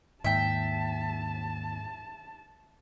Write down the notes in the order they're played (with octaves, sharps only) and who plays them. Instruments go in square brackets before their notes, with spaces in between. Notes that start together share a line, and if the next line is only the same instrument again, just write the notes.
[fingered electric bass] D#2 [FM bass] G#2 [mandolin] E5 G5 [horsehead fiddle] A5